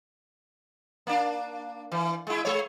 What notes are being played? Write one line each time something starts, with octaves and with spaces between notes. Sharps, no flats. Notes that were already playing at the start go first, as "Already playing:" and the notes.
A#3 D4
E3
G#3 E4
G#3 C#5